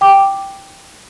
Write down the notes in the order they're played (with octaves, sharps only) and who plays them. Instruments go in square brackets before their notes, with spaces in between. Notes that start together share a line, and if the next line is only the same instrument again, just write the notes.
[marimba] G5 D6